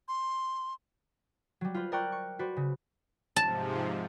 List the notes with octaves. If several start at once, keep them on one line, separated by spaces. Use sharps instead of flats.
C6
F#3 G3
F4 B4 C5
A#4 D5 G5 C#6 F#6
C#6
F#4 B4 C5 D5
C#3
G#2 C3 F3 A5